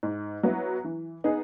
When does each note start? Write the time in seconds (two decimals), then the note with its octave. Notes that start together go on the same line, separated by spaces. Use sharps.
0.03 G#2
0.43 F#3 B3 E4
0.84 E3
1.24 B3 D#4 G#4